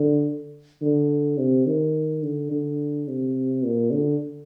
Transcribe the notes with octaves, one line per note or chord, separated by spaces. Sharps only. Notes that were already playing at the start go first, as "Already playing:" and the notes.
Already playing: D3
D3
C3
D#3
D3
D3
C3
A#2
D3